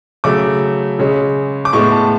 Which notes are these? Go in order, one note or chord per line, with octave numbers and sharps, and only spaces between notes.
C#3 F#3 A3 D6
C#3 G#3 C#4
D6
A2 G#3 B3 C#6
A5